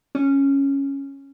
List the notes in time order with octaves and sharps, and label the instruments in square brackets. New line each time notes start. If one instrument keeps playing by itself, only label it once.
[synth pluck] C#4